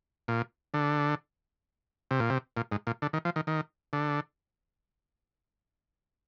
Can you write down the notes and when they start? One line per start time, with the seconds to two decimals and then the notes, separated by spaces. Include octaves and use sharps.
0.28 A#2
0.74 D3
2.11 C3
2.20 A#2
2.30 C3
2.57 A#2
2.72 G#2
2.87 A#2
3.02 D3
3.13 D#3
3.25 F3
3.36 D#3
3.47 D#3
3.93 D3